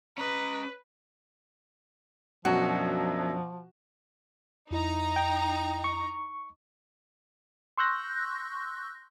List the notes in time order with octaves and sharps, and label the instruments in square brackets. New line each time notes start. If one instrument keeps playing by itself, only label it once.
[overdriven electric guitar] C#4 D#5 [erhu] B4 [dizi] A#5
[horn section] F#2 D4 E5 [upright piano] B2 F#3 [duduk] F3 [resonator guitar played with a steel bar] F#4
[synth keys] F2 E4 D#5 [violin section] D#4 A#5
[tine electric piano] G5
C#6
[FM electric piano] C6 C#6 E6 F#6 G6 A#6